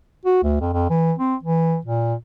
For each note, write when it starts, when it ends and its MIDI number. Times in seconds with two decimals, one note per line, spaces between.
0.25 0.42 66
0.43 0.60 38
0.61 0.70 41
0.73 0.86 41
0.90 1.12 52
1.19 1.35 60
1.43 1.77 52
1.85 2.14 46